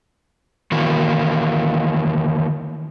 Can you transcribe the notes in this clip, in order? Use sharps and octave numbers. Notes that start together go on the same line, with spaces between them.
D#3 E3 A#3 F#4